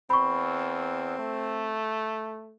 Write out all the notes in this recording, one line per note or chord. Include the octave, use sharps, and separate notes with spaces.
E2 C4 B5 C#6
A3